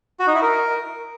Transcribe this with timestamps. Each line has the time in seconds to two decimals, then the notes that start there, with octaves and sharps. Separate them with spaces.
0.20 F#4
0.27 D#4
0.35 E4
0.42 A#4